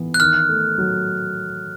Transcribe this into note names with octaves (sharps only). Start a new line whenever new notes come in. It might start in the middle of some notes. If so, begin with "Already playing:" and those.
Already playing: E3 B3
F#6
D#3 F6
A3
F#3